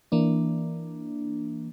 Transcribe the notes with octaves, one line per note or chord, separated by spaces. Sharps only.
E3 A#3 D4